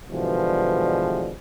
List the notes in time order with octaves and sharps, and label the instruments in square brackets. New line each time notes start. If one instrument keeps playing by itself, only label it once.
[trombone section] B2 D3 E3 F3 G3 G#3